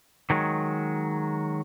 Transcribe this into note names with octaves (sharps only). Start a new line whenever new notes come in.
D#3 F#3 G#3